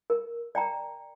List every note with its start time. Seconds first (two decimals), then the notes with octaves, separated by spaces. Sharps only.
0.10 A#4
0.55 D5 G5 A#5